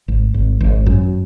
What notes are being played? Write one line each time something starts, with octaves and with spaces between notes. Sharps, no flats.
G#1
G#1
G#1
F#2